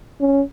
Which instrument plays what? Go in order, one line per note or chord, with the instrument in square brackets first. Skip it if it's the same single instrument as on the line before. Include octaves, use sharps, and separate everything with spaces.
[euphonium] C#4